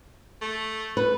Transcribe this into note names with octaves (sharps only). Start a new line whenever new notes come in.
A3
B4